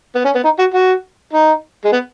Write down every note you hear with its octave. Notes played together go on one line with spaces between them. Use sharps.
B3
C#4
B3
D#4
F#4
F#4
D#4
G#3
B3